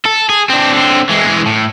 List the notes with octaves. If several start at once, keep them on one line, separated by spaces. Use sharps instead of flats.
A4
G#4
C4 D4
D3 C4
E3 G#3
A2